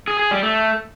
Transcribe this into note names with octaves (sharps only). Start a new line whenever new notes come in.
G#4
G#4
G3
A3